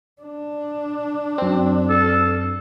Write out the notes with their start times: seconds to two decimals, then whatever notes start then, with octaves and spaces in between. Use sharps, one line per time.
0.22 D4
1.38 F#2 C4
1.90 A4